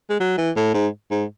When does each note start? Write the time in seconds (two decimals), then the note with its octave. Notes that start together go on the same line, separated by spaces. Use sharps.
0.09 G#3
0.20 F#3
0.38 E3
0.56 A2
0.74 G#2
1.11 G#2